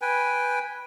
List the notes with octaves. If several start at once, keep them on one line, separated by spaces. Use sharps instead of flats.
B4 G5 G#5